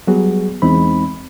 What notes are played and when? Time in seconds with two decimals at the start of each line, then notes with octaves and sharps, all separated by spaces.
0.07 F#3 G3 B3 F#4 G#4
0.62 E2 G#3 C4 D#4 B5